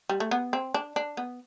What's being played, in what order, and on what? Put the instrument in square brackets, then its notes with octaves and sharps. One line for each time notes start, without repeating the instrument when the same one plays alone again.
[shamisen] G3
A3
B3
C4
D4
D4
B3